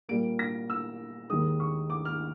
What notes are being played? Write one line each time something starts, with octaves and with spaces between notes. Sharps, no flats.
A#2 G3 A#3 D7
A#6
E6
D#2 D#3 G#3 D#6
C#6
D6
F6